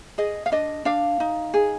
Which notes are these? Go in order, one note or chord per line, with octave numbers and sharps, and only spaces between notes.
G#4 D#5
F5
D4 D#5
D4 F5
D#4
G#4